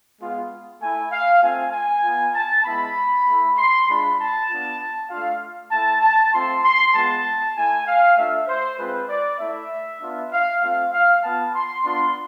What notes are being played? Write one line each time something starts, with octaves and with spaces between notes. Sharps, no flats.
G#3 B3 F4
A3 E4 G#5
F5
A3 C4 F4 G#5
G#5
B3 F4
A5
G#3 B3 E4 B5
A3 E4
C6
G#3 D4 F4 B5
A5
B3 D4 F4
A3 D4 F4 F5
A3 E4 A5
A5
A3 C4 F4 C6
C6
G#3 B3 F4 A5
A3 E4 G#5
F5
A3 D4 F4 E5
C5
G#3 C4 F4 B4
D5
A3 E4 E5
B3 D4 F4
F5
A3 C4 F4 F5
F5
B3 F4 A5
C6
B3 D4 F4 C6